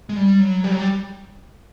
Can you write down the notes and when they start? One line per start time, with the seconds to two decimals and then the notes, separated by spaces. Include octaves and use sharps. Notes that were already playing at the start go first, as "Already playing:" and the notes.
0.09 G#3
0.16 G3
0.40 F#3
0.64 G3
0.71 F#3
0.78 G3